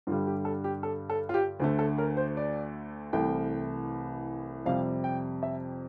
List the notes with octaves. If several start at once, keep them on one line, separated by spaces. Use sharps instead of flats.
G2 D3 G3 F4
G4
A4
G4
A4
A4
F4
G4
D2 D3 A3
A4
A#4
C5
D5
C2 C3 E3 A3 G5
F2 C3 G3 F5
G5
E5